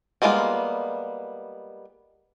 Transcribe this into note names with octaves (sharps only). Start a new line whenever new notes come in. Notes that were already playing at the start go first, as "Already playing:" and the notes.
G3 G#3 A#3 B3 F4